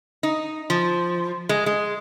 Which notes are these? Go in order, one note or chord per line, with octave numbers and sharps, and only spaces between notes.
D#4
F3
G#3
G#3